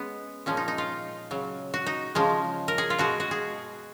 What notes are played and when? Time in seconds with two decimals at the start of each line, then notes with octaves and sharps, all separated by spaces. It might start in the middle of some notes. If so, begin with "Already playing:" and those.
Already playing: G#3 B3 C#4
0.46 A#2 F3 G#3 C#4
0.57 D#4
0.68 D#4
0.78 F4
1.31 C#3 F#3
1.74 F#4
1.86 D#4
2.15 C#3 F3 G#3
2.68 A#4
2.78 G#4
2.90 F4
2.98 B2 G#3 F#4
3.20 F#4
3.31 G#4